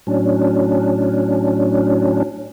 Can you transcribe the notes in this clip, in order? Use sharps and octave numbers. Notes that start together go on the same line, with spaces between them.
A2 F#3 C#4 D4